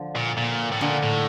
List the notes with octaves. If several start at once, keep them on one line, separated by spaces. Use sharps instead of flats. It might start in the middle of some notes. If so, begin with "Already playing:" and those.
Already playing: D3 F3
A#2
A#2
A2
A#2 D3
A2